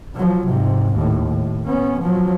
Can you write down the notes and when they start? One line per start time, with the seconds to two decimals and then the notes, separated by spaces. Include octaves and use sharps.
0.15 F3 F#3
0.48 G#2 C3
0.95 D#2 A2
1.27 A2
1.67 B3 C#4
2.01 F3 F#3